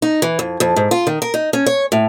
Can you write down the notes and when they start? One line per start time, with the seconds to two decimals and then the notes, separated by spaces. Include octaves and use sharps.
0.02 D#4
0.22 E3
0.39 F2
0.60 F2
0.76 G#2
0.91 F4
1.07 D#3
1.22 A#4
1.34 D#4
1.53 C#4
1.66 C#5
1.92 A2